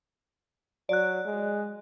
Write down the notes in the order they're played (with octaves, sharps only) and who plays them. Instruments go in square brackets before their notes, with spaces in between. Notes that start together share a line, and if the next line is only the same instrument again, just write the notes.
[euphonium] F#3 [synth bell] D5 F#6
[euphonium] G#3